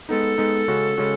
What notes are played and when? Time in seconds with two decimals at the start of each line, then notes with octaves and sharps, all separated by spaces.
0.09 G#3 B3 D#4 A4
0.38 G#3 B3 D#4
0.68 C#3 G#3 C#4 F#4
0.97 C#3 G#3 C#4 F#4